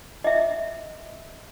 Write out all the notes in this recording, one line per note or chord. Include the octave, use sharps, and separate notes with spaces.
D#5 E5